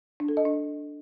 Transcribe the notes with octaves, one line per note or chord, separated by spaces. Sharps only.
D4
A4
D#5
D4